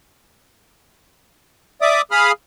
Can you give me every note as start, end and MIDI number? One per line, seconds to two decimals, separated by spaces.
1.81 2.01 74
1.81 2.01 76
1.81 2.01 86
1.81 2.01 87
2.11 2.32 68
2.11 2.32 77
2.11 2.32 83
2.11 2.32 87
2.11 2.32 89